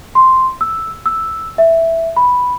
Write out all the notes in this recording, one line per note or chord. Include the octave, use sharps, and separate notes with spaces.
C6
E6
E6
E5
B5